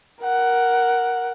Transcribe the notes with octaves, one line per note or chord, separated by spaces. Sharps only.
A#4 F#5